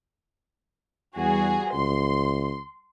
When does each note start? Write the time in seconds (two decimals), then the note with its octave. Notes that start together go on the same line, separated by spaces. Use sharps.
1.17 E2 G3 F#4 G#4
1.73 C#2 C6